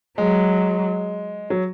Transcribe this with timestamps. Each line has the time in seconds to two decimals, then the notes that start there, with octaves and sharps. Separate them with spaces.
0.18 F#3 G#3
1.50 F#3